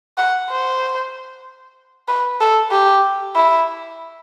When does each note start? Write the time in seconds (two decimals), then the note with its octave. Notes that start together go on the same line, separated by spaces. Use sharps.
0.18 F#5
0.51 C5
2.08 B4
2.40 A4
2.71 G4
3.35 E4